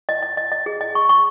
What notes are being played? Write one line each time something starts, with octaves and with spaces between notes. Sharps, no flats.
D#5
D#5
D#5
D#5
G#4
D#5
C#6
C#6